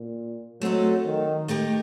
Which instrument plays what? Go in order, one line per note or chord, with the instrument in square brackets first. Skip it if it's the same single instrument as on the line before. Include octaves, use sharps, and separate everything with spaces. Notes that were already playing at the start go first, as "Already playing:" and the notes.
Already playing: [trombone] A#2
[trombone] F#3 [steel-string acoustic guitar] A3 C4 D#4 A4
[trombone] D#3
[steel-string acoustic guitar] A3 D#4 G4 A#4